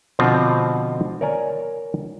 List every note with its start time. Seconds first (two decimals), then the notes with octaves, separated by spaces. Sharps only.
0.19 B2 D3 F3 C4 F4
1.21 A#4 C#5 D5 G#5 A#5